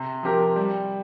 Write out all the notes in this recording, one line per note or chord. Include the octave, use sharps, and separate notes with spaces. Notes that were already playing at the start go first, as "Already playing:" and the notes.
Already playing: C3
F3 C4 G4 A#4
G3